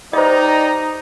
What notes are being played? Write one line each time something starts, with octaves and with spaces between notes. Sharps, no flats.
D#4 G4 C5 D5 D#5 A#5